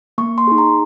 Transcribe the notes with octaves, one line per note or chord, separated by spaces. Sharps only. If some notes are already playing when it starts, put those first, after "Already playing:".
A#3 C#6
C6
D#4 G#4
A#5